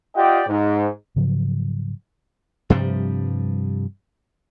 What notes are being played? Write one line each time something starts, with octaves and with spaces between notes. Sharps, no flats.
F4 G4 D5 D#5 F#5 G5
G#2
G#2 C#3 F3 F#3
G2 C3 F3 G3